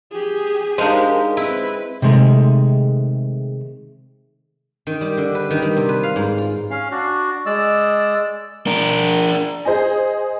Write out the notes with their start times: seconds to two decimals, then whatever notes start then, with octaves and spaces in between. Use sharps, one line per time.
0.11 G4 G#4
0.78 G#3 D4 D#4 G4 A#4 C5 F5
1.37 C4 E4 B4
2.02 C3 D#3 G#3 A3
4.87 D#3
5.01 G3
5.17 D3
5.35 B4
5.51 D#3
5.62 G3
5.77 C3
5.89 B4
6.03 F5
6.16 G#2
6.38 F4
6.71 C#4 F5
6.91 D4 F#4
7.46 G#3 D5 E6
8.67 D4 A#4
9.65 G#4 C5 D#5 G#5